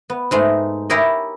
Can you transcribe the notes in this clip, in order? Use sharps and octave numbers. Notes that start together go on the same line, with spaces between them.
B3
G#2 G#3 A3 D#4
E4 G4 G#4 A#4 C#5 D#5